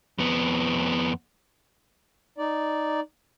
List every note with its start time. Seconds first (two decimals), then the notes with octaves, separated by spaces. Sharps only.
0.18 F2 B3
2.38 D#4 D5